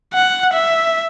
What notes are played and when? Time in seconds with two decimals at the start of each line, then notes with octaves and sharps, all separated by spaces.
0.14 F#5
0.53 E5